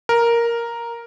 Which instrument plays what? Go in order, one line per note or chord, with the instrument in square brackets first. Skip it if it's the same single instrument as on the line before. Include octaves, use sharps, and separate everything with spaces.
[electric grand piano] A#4